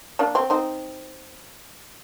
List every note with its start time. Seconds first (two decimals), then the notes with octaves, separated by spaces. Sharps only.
0.19 A#3 D4
0.35 C4
0.50 C4 D#4